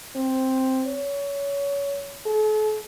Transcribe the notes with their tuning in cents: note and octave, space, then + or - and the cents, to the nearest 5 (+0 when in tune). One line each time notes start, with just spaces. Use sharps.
C4 +0
C#5 +25
A4 -45